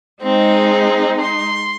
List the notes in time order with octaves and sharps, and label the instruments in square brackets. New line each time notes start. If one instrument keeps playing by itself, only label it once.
[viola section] G#3 D#4 [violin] C4
[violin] C6